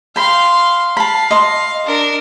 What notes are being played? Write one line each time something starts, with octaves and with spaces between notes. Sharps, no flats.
F5 G5 B5 C6
F5 A5 B5
D#5 C6
D4 A#4